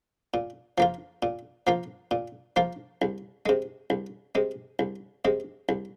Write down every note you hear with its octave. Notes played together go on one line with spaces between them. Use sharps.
A#2
F3 A#3 F4
A#2
F3 A#3 F4
A#2
F3 A#3 F4
C2
C3 G#3
C2
C3 G#3
C2
C3 G#3
C2